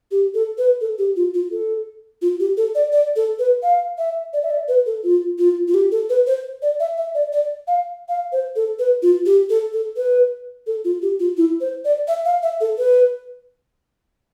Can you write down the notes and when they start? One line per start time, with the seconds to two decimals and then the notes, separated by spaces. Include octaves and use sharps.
0.11 G4
0.34 A4
0.58 B4
0.81 A4
0.98 G4
1.16 F4
1.34 F4
1.52 A4
2.22 F4
2.40 G4
2.57 A4
2.75 D5
2.93 D5
3.16 A4
3.39 B4
3.63 F5
3.98 E5
4.33 D5
4.43 E5
4.51 D5
4.68 B4
4.86 A4
5.04 F4
5.39 F4
5.68 F4
5.74 G4
5.92 A4
6.10 B4
6.27 C5
6.62 D5
6.80 E5
6.97 E5
7.15 D5
7.32 D5
7.67 F5
8.09 F5
8.32 C5
8.56 A4
8.79 B4
9.02 F4
9.26 G4
9.50 A4
9.73 A4
9.97 B4
10.67 A4
10.85 F4
11.02 G4
11.20 F4
11.37 E4
11.61 C5
11.85 D5
12.08 E5
12.25 F5
12.43 E5
12.61 A4
12.78 B4